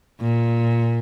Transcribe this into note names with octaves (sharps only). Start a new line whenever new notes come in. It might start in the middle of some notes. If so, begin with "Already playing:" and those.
A#2